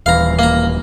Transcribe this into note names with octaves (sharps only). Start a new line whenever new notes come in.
D#1 E3 F5 A#5
A#3 A#5